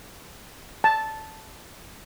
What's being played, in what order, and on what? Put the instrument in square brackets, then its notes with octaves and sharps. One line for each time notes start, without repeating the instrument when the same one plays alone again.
[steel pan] A5